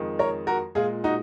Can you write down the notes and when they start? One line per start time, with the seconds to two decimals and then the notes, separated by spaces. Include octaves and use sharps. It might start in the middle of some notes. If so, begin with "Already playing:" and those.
Already playing: F2 D#3 G#3
0.19 A#4 C#5
0.47 F#4 A#4
0.75 A#2 G#3 F4 G#4
1.04 D#4 F#4